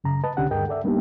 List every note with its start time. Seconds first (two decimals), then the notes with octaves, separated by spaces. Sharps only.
0.04 F#2 C#3 A#5
0.24 B4 D#5 A5
0.37 C2 D3 C#4 D4 G4 F#5
0.51 D2 G2 G#4 A#4 D#5 G5
0.69 A4 D5 E5
0.84 G3 A#3 B3 D4 D#4 G4